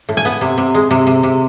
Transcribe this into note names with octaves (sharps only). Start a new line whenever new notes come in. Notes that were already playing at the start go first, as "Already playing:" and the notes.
A2
G#5
B3
C3
C3
G#3
C3
C3
C3